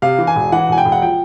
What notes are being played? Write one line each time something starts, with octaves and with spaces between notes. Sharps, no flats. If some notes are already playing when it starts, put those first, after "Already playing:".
C3 F5
E3
G#5
E1
E3 F#5
E1 G#5
G5
E1
F#5
F3 G5